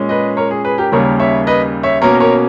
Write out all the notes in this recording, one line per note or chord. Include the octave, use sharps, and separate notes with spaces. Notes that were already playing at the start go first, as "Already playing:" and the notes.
Already playing: A#2 G#3 C#4
B4 D#5
A#4 C#5
G#4
G#4 B4
G4 A#4
D#2 C#3 G3 A#3 A#4 C#5
C#5 E5
B4 D#5
C#5 E5
B2 A#3 C#4 A#4 C#5
A#4 C#5